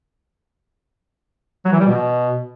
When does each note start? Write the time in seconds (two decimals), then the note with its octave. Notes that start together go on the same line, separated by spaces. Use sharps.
1.65 F#3
1.72 E3
1.80 G3
1.87 B2